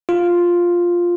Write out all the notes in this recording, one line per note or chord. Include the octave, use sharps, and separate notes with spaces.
F4